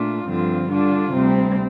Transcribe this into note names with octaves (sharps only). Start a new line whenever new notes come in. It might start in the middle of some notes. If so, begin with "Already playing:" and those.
Already playing: A#2 A3 D4 F4
G2 D3 F3 C4 F4
D3 G3 D4 F4
D2 C3 G3 C4